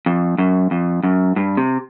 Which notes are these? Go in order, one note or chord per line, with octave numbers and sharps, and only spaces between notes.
F2
F#2
F2
F#2
G2
C3